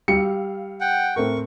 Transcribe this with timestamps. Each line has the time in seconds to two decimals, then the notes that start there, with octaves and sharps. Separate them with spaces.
0.08 G3 F5 E6 C#7
0.81 F#5 G5
1.16 A2 A3 C4 A#4 C#6